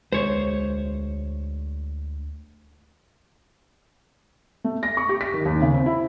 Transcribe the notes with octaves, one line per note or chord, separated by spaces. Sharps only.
D2 G#3 C5 C#5
A3
A#6
C#6
G4
B6
D#3
D#2
C#3
C4
E4